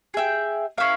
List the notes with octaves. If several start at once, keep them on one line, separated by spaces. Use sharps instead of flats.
G#4 E5 G5
C#4 E4 A#4 F5